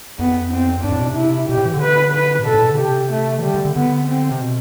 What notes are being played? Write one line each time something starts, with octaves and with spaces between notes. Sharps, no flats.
F2 B3
C4
G2 D4
A2
B2
C3
E4
B2 G4
A2
E3
D3
B4
B4
A2
B2 A4
A2
B2
D3
C3 G4
A3
E3
D3 G3
D3
D3
D3 B3
C4
C3
B2